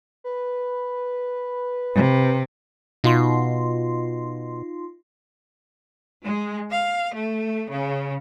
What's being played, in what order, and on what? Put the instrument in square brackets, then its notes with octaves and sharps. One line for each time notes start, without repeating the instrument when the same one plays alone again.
[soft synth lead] B4
[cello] C3
[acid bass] B2 [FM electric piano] D#4 F4 C6
[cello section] G#3
F5
A3
C#3